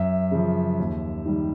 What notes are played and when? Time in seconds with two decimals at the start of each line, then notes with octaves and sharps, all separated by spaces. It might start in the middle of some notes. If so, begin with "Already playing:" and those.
Already playing: F#2 E5
0.31 C#3 F3
0.79 D#2
1.25 D#3 G3